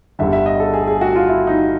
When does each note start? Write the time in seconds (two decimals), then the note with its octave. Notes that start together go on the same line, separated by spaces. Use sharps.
0.19 G1 G2 D3 E5
0.33 E5
0.46 D#5
0.60 A4
0.74 G#4
0.87 G#4
1.01 F#4
1.16 F4
1.29 E4
1.47 D#4